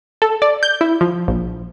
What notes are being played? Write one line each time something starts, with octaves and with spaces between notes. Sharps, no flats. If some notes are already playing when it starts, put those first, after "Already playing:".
A4
D5
G6
E4
F3
A#1